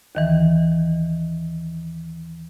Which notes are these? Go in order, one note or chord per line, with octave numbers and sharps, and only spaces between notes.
D#2 D#3 E3